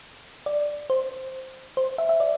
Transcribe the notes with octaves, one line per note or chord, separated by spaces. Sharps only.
D5
C5
C5
E5
E5
D5